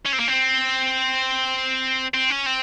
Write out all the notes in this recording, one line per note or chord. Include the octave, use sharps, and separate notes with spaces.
C#4
C4
A#3
C4
C4
C#4
C4